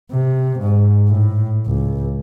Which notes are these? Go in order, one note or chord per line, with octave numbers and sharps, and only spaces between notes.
C3
G#2
A2
C#2